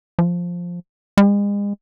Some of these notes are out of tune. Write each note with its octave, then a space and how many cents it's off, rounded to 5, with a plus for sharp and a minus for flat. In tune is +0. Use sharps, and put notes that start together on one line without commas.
F3 +5
G#3 -40